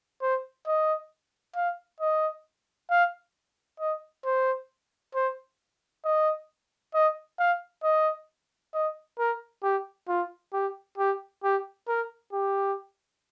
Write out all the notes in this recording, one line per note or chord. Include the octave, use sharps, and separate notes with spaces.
C5
D#5
F5
D#5
F5
D#5
C5
C5
D#5
D#5
F5
D#5
D#5
A#4
G4
F4
G4
G4
G4
A#4
G4